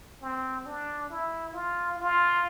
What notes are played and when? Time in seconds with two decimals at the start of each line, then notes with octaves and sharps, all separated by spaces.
0.22 C4
0.66 D4
1.10 E4
1.54 F4
1.98 F4